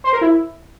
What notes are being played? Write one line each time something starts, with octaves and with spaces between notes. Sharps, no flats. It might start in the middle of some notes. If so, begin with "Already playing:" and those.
C5
A#4
E4